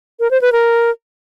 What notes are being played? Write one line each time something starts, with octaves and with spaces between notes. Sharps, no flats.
A#4
C5
B4
A#4